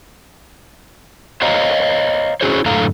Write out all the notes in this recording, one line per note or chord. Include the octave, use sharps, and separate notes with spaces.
C5 C#5 D#5 F5 A#5
C#4 E4 F#4 G#4 C5 C#5
F#2 A2 D3 A4 F5 A#5